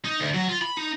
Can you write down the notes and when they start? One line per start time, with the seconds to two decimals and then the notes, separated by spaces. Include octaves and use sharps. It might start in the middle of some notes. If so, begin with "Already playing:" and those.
0.05 D#4
0.20 D2
0.34 F#3
0.48 F4
0.62 B5
0.77 D#4